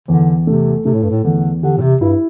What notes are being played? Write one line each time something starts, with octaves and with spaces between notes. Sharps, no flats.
E2 D3
C3 A3
C3 A3
A2
G2
A2
E2 D3
D3 G4
A2
C3
G2 E4